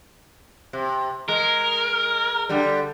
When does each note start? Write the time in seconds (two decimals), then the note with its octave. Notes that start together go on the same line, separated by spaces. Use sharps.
0.73 C3
1.29 G#3 A#4
2.49 D3 G3